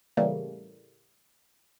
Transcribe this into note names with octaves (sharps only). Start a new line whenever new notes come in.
A2 C#3 E3 G3 A3 A#3